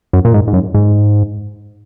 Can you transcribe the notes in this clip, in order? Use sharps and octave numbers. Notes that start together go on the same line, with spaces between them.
F#2
A#2
G#2
G#2
F#2
G#2